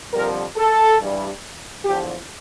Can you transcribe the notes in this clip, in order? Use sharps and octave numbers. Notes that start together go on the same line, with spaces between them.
F2 D3 G3 A#4
A4
G2 E3 G3
E2 D3 F3 G4